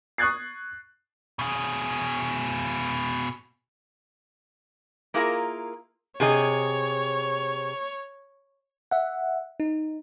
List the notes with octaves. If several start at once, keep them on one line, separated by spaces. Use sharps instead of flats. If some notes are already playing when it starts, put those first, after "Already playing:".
C#6 D#6 F#6 G#6 A6 C7
B2 G#4
A#3 E4 F4 G#4 A#4
C3 G#4 C#5 D#5
E5 F#5
D#4